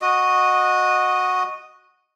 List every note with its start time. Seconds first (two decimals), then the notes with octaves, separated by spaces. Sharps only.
0.02 F#4 D#5 D#6